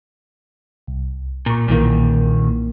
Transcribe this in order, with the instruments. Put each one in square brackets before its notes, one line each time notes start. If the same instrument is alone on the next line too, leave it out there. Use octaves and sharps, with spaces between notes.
[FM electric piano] C2
[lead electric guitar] A#2 [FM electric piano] A#5 C#6
[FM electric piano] B1 E3 A#3 [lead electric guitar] A#2 D#3